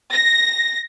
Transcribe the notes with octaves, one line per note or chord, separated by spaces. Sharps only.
A#6